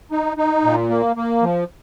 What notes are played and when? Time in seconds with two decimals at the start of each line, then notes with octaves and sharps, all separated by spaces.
0.11 D#4
0.37 D#4
0.64 A#2
0.90 A#3
1.16 A#3
1.42 F3